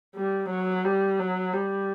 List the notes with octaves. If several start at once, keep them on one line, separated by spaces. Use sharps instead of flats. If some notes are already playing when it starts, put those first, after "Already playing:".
G3
F#3
G3
F#3
G3